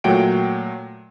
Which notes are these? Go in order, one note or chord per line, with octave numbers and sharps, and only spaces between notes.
A#2 F#3 A3 F#5 G5 D7